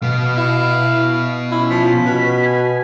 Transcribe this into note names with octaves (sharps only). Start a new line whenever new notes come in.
B2 B3 F5
E4 F5
C#4 E4
F3 B6
B2
G#5